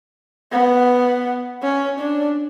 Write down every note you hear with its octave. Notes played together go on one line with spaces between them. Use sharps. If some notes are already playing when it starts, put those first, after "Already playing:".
B3
C#4
D4